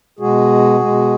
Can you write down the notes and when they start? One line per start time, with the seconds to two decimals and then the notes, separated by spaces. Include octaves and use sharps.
0.19 B2 G#3 F#4 G#4
0.80 B2 G#3